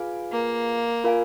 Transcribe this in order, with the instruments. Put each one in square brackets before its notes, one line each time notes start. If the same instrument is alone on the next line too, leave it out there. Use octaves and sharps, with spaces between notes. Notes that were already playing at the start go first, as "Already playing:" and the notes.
Already playing: [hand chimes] F4 G#4 B4 F5 G#5
[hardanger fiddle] A#3
[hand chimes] F4 A#4 F5 G#5